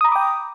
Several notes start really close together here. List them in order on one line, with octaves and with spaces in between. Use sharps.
D#6 A#5 B5 D6 G5